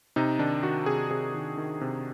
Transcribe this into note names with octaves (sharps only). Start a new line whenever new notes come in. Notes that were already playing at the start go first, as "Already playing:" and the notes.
C3 D#4
D#3 D4
D#3 F#4
C3 G#4
C3 G#4
D#3
D#3
C3